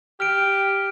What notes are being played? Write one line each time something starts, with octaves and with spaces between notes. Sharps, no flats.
G4 F6 D7